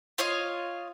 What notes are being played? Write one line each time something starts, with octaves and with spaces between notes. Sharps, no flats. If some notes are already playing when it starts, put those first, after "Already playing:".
F4 C#5 D#5 F5